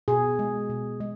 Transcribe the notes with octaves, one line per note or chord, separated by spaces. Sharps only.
B2 G#4
G#3
B2
G#3